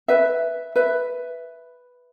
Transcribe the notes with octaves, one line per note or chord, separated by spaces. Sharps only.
B4 E5
B4 E5